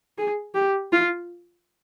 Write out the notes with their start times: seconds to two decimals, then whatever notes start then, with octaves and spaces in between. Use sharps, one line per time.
0.18 G#4
0.55 G4
0.92 F4